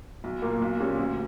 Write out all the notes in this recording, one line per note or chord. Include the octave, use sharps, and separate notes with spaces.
B1
A#2 A#3
B1
A#2 G3 C#4
D2